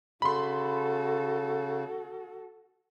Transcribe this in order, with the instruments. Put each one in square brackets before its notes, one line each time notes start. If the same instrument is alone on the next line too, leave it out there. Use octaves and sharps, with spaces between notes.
[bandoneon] C#3 [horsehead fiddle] F#4 A4 [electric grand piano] B5 C6